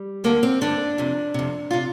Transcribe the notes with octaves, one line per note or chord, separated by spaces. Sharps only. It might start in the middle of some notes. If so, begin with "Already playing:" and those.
Already playing: G3
D2 D3 A#3
C4
G2 D3 D4
F2 C3
F2 C3
C3 F4